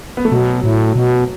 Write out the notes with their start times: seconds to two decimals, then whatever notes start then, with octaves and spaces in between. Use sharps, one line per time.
0.17 B3
0.25 A3
0.32 B2 F#3
0.64 A2
0.96 B2